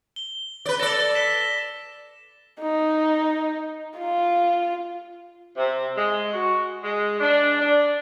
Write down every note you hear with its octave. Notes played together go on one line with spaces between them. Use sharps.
G7
B4 D5
A4 D5 A#6
B6 E7 G7
D#4
F4
C3
G#3
F#4
G#3
D4
D4